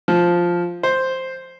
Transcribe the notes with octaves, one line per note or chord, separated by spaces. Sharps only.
F3
C5